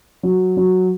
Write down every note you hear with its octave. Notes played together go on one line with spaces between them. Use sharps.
F#3
F#3